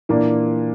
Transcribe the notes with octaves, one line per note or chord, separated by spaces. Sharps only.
A#2 E3 A#3 D4